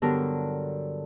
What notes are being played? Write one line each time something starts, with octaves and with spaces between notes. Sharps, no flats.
G2 D3 F#3 B3 A#4